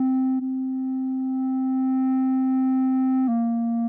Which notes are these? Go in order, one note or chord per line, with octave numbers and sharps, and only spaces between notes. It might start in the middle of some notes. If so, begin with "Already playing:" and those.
Already playing: C4
C4
A#3